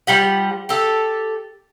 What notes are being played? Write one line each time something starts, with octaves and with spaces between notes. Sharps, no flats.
F3 G3 G4 F#5
G4 A4